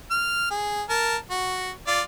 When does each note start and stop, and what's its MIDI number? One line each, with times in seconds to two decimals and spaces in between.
0.11 0.49 89
0.50 0.82 68
0.89 1.16 70
0.89 1.16 81
1.30 1.70 66
1.87 2.01 65
1.87 2.01 74